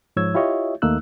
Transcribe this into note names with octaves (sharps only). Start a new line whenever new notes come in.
G#2 F3 C#5 E6 G#6
E4 F4 G4 C#5 D#5 E5
D#2 A3 A#3 D#4 E6 F#6